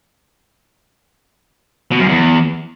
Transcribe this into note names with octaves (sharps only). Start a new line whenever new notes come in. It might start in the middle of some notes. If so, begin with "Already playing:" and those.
B2
F#2
E2